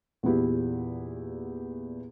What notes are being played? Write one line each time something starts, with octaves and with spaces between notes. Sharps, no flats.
E2 A#2 B3 E4 G4